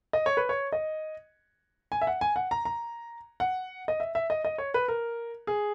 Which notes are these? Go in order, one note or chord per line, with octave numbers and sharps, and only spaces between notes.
D#5
C#5
B4
C#5
D#5
G#5
E5
F#5
G#5
F#5
A#5
A#5
F#5
D#5
E5
E5
D#5
D#5
C#5
B4
A#4
G#4